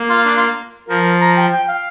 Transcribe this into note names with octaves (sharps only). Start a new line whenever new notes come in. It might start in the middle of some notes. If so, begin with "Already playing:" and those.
Already playing: A#3
F4
D4
F4
F3 A#4
A#5
G5
G5
F5